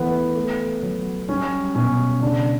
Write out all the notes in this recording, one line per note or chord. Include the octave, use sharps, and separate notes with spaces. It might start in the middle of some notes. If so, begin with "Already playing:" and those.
Already playing: E3 A3 B3
A3
F#3
G3 C#4
B2 C#4
C#3 D4